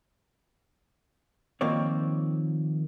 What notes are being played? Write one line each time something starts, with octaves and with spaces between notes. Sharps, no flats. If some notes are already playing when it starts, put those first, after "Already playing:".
D#3 F3 A#3 C4 C#5 D5